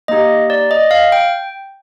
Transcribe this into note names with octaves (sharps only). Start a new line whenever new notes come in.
A#3 D#4 G4 D#5
D5
D#5
F5
G5